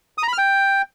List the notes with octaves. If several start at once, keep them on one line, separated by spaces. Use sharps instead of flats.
D#6
A#5
B5
F6
G5